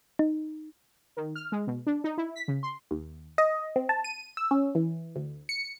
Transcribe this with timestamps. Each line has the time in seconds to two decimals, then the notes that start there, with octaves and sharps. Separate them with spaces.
0.19 D#4
1.17 D#3
1.36 F6
1.52 G#3
1.67 B2
1.87 D4
2.04 D#4
2.18 E4
2.36 B6
2.48 C#3
2.63 C6
2.91 D#2
3.38 D#5
3.76 C4
3.89 A5
4.04 D#7
4.37 E6
4.51 C#4
4.75 E3
5.16 D2
5.49 C#7